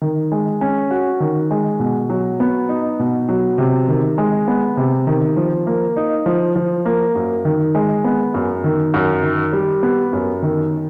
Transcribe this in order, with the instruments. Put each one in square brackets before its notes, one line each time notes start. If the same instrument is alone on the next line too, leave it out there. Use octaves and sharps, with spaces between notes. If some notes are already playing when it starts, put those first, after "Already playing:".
[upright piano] D#3
G#3
C#4
F#4
D#3
G#3
B2
F#3
B3
D#4
B2
F#3
C3
D#3
G#3
B3
C3
D#3
F3
A#3
D#4
F3
F3
A#3
F#2
D#3
G#3
B3
F#2
D#3
F#2
D#3
G3
B3
F#2
D#3